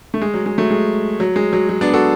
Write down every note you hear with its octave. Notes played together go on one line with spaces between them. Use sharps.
A3
G#3
F#3
G#3
F#3 A3
G#3
F#3
G#3
F#3
F#3
B3 D4
F#4 A4